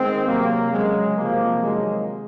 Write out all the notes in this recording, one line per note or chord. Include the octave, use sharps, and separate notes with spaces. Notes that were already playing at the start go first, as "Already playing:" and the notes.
Already playing: D#3 G#3 C4
C3 F#3 A#3
C#3 F#3 G#3
C3 F3 A#3
C3 D#3 F#3 G#3